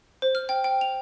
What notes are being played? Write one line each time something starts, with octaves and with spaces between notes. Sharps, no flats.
C5
F6
G5
G5
F7